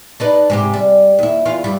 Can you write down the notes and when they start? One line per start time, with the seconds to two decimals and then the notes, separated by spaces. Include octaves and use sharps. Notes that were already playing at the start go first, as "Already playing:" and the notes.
0.20 D4 D#4 B4
0.50 G#2 C3 G4
0.74 G3
1.19 D#2 E4
1.45 E2 F4 F5
1.64 G2 G3